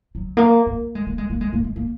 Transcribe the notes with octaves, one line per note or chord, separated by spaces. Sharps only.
F#3
A#3
A#3
G#3
A#3
G#3
A#3
G#3
A#3
G#3
A#3